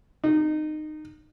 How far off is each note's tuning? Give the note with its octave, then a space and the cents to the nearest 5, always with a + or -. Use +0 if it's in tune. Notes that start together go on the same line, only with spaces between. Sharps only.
D#4 -20